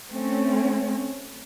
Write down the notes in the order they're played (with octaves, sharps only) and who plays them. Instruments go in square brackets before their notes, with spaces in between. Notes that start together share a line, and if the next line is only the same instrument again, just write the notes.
[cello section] A3 C4 C#4